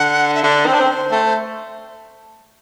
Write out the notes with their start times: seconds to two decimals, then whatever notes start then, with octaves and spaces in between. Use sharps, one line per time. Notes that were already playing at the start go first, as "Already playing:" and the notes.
Already playing: D3 F#5
0.35 E5
0.43 D3 D5
0.65 C4 C5
0.73 D4
0.80 C4
1.11 A3
1.26 C5